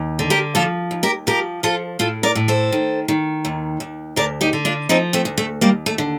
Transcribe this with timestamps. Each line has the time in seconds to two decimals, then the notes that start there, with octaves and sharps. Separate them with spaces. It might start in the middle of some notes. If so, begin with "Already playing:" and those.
Already playing: D#2
0.19 D3
0.30 G4 A#4
0.55 F3 F4 A4
0.91 D#2
1.03 G4 A#4
1.27 F3 G4 A#4
1.63 F3 F4 A4
1.99 A2 F4 A4
2.23 A#4 D5
2.35 A2
2.48 A4 C5
2.72 D#3
3.08 D#3
3.45 D#2
3.80 D#2
4.16 D2 A#4 D5
4.41 D#4 G4
4.53 D3
4.65 D4 F4
4.89 F3 C4 D#4
5.13 A3 C4
5.25 D2
5.38 A3
5.61 D#2 G3 A#3
5.86 A3
5.98 D3